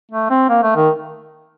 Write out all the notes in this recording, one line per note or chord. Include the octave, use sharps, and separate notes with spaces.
A3
C4
A#3
A3
D#3